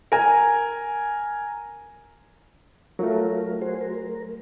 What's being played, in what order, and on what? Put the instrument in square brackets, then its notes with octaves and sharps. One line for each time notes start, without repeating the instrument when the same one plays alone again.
[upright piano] A#4 G#5
[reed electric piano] F#3 A3 [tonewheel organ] F4 A#4
[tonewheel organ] F#4 G#4 C5
A#4